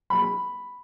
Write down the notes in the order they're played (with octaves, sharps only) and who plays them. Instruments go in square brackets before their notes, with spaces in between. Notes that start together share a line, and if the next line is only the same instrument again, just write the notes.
[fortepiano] B5